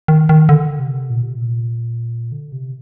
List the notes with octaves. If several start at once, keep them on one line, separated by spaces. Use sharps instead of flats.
D#3
D#3
D3
C3
A#2
C3
A#2
D3
C3